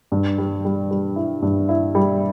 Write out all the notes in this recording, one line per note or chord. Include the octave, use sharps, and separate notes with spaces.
G2
G3
G3
G3
E4
G2
E4
G3